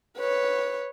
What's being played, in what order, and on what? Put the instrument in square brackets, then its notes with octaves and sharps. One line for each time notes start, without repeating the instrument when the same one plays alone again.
[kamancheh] B4 C#5